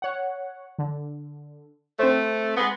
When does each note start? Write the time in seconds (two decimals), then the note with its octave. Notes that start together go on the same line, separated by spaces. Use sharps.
0.02 C#5 F#5
0.78 D3
1.99 A3 C4 C5
2.57 G#3 B3